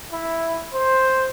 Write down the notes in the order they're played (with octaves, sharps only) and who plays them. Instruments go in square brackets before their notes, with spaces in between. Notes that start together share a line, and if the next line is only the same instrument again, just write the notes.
[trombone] E4
C5